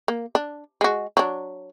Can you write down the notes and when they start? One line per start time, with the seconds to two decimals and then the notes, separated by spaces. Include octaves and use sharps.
0.08 A#3
0.35 D4
0.81 G#3 F#4
1.17 F#3 D4